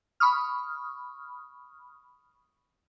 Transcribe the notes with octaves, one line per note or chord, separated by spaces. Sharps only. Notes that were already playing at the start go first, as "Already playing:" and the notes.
B5 C#6 D#6 F6